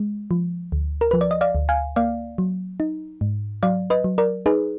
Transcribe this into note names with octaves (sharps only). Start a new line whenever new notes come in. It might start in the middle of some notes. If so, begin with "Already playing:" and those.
Already playing: G#3
F3
D2
A#4
F3 B4
D5
D#5
D5 F5
D2
F5 G#5
A#3 D5 F5
F#3
D#4
G#2
F#3 D5 F5
B4 D#5
F#3
A#4 D5
D#4 G#4 B4